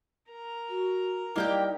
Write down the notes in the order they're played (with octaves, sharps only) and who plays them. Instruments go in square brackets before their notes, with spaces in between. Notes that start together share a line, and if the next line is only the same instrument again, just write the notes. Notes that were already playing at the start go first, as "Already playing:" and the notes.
[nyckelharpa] A#4 A#5
[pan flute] F#4
[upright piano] G3 D#4 E4 [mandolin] A#3 G4 G5 [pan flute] D5